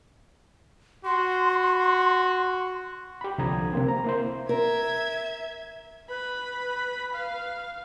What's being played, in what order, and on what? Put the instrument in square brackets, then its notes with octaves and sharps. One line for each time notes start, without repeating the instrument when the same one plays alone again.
[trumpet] F#4 [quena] C6
[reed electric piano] G4 B5
C2 D3 F3 A#5 D#6 G#6
C3 A#3 C4
A#5
A#3 E4 C5
[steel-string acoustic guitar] A#4 [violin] E5 G#6
[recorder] B4 [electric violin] B5
[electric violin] F5